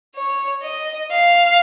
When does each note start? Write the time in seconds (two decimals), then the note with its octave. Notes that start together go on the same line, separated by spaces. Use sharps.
0.16 C#5
0.63 D#5
1.11 F5